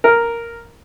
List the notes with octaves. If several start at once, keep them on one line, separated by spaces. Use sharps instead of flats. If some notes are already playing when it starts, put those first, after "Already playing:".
A#4